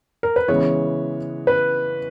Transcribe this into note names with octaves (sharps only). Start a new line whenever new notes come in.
A#4
B4
C#3 E3 G#3 B3 C#5
B4